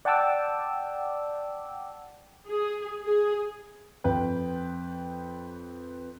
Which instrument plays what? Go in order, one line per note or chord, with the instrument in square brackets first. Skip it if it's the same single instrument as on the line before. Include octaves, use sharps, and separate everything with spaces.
[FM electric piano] D5 F#5 G5 A5 D6 E6
[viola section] G#4
G#4
[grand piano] F2 B4 G5